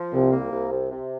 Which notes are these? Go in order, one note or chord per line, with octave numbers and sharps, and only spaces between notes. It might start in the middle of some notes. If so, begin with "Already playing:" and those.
Already playing: F3
C2 C3
A#3
C2
C3
C3